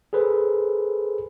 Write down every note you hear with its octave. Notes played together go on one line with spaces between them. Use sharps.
G#4 A4 B4 C5